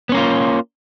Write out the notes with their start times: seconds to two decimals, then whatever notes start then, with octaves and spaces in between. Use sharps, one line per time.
0.09 B3
0.12 C#4
0.15 A#3
0.17 F4